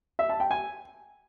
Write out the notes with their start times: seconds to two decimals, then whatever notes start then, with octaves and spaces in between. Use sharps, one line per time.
0.19 E5
0.29 A5
0.40 G5
0.51 G#5